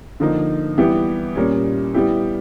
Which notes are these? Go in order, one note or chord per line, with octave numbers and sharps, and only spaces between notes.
D3 F3 A#3 D#4
E3 G3 B3 E4 G4
A#2 G3 A#3 C#4
G3 B3 E4 G4